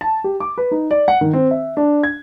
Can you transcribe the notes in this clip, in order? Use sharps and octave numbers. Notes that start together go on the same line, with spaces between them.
A5
G4
D6
B4
D#4
D5
F#5
D#3
C4
E5
D4
G#6